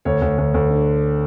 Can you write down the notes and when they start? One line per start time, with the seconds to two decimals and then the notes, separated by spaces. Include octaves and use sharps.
0.05 D2 C#5
0.22 D2
0.38 D2
0.54 D2
0.70 D3